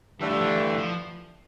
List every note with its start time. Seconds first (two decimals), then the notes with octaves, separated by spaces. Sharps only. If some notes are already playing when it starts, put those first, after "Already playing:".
0.20 G2 D3 E3 A3
0.30 F3
0.40 E3
0.78 F3